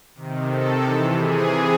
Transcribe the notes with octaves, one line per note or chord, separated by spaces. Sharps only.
C3 D#3
C3 D#3 A4
C3 E3
C3 E3 G#4